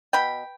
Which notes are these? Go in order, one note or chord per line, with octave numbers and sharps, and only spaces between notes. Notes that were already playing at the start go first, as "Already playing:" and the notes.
B2 G5 B5